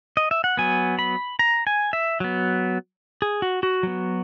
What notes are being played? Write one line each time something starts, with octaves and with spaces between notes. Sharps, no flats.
D#5
E5
F#5
F#3 B3 G#5
B5
A#5
G#5
E5
F#3 B3
G#4
F#4
F#4
F#3 B3